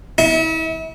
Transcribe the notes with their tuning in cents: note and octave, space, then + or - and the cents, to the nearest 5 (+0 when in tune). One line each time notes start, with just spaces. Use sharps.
E4 -40